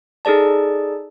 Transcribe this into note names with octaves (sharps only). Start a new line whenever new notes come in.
D#4 G#4 A4 D5 A5